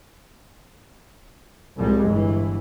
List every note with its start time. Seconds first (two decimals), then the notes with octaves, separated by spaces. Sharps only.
1.77 C2 F2 A2 G3 G#3
2.06 G1 G2 E3